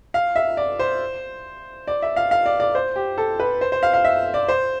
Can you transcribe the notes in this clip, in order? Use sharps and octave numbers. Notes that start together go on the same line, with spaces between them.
F5
E5
D5
C5
D5
E5
F5
F5
D5
D5
C5
G4
A4
B4
C5
C5
F5
F5
E5
D5
C5